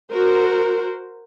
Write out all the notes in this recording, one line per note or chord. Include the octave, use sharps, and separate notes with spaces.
F#4 A#4 C5